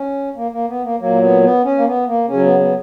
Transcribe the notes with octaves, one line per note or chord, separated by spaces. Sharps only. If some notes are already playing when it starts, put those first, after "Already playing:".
Already playing: C#4
A#3
A#3
B3
A#3
A#2 F#3 A#3
B3
B3
C#4
A#3
B3
A#3
C#3 C#4
F#3
B3
B3